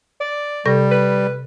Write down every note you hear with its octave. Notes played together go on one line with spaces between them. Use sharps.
D5
C3 G3 A4 A#6
B4